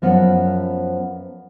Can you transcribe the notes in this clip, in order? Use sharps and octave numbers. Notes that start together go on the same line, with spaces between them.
F#2 F3 B3 F#5